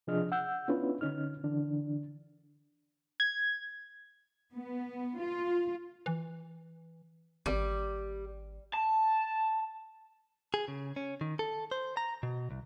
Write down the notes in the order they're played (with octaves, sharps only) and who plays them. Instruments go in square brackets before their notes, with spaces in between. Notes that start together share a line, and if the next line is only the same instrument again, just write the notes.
[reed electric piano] C3 F3 D4 G#4 D#5 F6
F#5 E6 G6
B3 C#4 D4 E4 F4 B4
D3 C#4 D#4 F6
D3 E3 D4
[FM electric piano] G#6
[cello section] B3
F4
[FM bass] E3
[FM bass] G#1 [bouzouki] G3
[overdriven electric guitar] A5
[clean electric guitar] G#4
C#3
C#4
D#3
A4
C5
A#5
B2
C2